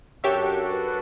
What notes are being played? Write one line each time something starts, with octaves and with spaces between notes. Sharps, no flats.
F#2 D4 F#4 G4 A4 C#5 E5
B4